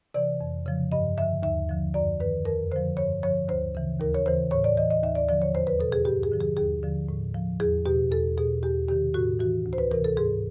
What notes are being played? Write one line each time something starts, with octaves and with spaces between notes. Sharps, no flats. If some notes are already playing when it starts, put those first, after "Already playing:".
C3 E3 D5
F2
C#3 F3
G2 D#5
D3 F3 E5
D#2 E5
D3 F3
F#2 D5
D#3 B4
F2 A#4
D3 F3 C5
G2 C#5
D3 F3 C#5
D2 C5
C#3 E3
D#2 A#4
C#5
C#3 E3 C5
A2 C#5
D5
E3 D#5
D#5
D#2 E5
D5
D3 F3 D5
C#5
E2 C5
B4
B2 A4
G#4
G2 G4
G#4
D3 F3
G#4
D#2 G#4
D3 F3
A2
F3
E2 G#4
B2 G4
E2 A4
B2 G#4
E2 G4
C3 D#3 G4
A2 F#4
E3 F#4
D2
C5
B4
C3 E3 A#4
A4
G#2 G#4